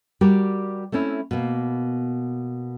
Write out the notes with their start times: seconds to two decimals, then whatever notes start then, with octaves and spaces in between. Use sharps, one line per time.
0.21 G3 F#4 G4 A#4 D5
0.92 A3 C4 C#4 E4
1.31 B2 A#3